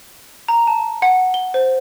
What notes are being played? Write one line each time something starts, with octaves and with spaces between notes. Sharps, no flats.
A#5
A5
F#5
G7
C5